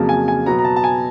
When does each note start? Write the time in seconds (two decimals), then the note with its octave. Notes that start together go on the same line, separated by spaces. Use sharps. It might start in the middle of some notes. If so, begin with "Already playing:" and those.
Already playing: F2 C#3 F#3 A#3 A5
0.09 G#5
0.28 G#5
0.46 B2 F#3 B3 A#5
0.59 A#5
0.64 A5
0.76 A5
0.84 G#5